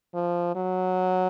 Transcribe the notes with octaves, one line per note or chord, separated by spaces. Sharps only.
F3
F#3